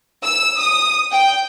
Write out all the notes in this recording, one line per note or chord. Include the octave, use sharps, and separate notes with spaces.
E6
D#6
G5